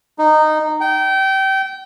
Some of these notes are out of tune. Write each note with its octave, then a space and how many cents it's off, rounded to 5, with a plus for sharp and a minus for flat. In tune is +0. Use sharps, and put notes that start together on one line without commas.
D#4 -15
G5 -25